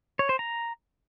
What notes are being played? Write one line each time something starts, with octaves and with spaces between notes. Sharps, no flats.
C#5
C5
A#5